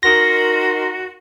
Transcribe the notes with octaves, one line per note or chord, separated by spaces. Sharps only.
D#4 F#4 A#4 C6 A#6